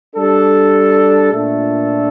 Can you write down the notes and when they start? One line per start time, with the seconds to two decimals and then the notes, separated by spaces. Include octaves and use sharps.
0.16 G3 D4 A4
1.32 A#2 A3 D4 A4